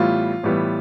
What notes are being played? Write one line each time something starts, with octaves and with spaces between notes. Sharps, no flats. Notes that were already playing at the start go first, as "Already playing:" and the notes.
Already playing: A2 E3 G3 B3 F4
A2 E3 G3 B3